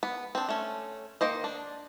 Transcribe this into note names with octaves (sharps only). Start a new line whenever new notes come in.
B3
C4 D4
A3 C#4
D#3 A#3 C5 D#5
D4